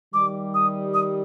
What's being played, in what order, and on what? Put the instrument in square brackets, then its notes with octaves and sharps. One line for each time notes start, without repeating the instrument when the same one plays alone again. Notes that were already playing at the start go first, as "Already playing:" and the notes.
[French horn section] D#3 G3 [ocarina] D6
[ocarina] D#6
D#6